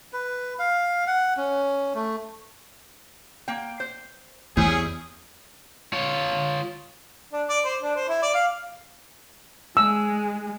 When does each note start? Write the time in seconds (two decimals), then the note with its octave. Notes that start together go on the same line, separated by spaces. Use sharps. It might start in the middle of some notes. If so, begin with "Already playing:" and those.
0.13 B4
0.59 F5
1.07 F#5
1.37 C#4
1.94 A3
3.48 A#3 G5
3.80 C5
4.57 E2 G3 C#4 E4 G#4 C5
5.93 F4 C#5
7.32 D4
7.48 D5
7.64 C5
7.81 D4
7.96 C5
8.08 E4
8.22 D5
8.34 F5
9.77 G#3 E6